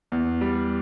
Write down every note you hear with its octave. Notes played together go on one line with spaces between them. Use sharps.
E2
G3